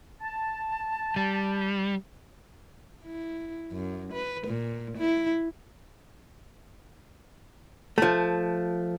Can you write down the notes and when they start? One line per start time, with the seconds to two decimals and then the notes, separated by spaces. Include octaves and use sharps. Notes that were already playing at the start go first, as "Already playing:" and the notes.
0.21 A5
1.16 G3
3.05 E4
3.72 F#2
4.13 B4
4.48 A#2
4.98 E4
7.98 F3 A3